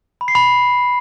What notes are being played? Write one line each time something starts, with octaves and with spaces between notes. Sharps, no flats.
B5
C7
B5